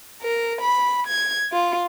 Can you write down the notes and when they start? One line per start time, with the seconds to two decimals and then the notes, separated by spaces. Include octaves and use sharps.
0.21 A#4
0.61 B5
1.07 G#6
1.52 F4